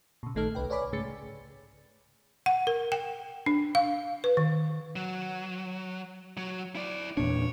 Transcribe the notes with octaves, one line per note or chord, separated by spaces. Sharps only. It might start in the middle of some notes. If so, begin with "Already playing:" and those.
A#2 C#3
A1 D#3 A3 D#4 A4 F6
C2 B4 G5
B4 C#5 D5 G#5 B5 D6
G#2 C#3 A3 G#4 A6 C#7
F#5
A#4
G5
D4
F5
B4
D#3
F#3
F#3
E4 D5
E2 A#2 D4 C#5